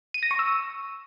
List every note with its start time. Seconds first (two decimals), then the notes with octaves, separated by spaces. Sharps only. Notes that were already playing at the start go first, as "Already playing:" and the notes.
0.14 D#7
0.23 A#6
0.31 C#6
0.39 E6